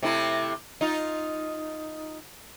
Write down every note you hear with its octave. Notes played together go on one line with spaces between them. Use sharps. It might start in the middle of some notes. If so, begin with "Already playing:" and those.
C3 A3 E4
D#4 F4